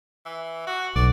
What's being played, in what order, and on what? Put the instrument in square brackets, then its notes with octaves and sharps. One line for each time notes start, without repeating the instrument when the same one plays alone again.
[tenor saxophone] E3
F#4
[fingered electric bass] B1 [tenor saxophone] D5